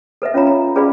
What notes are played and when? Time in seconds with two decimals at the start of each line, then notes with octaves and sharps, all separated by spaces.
0.22 A4 B4 D#5 E5
0.34 C#4 F4 C#5 F5 A#5 B5
0.47 A#5
0.75 C#4 G#4 B4 D5 F5 B5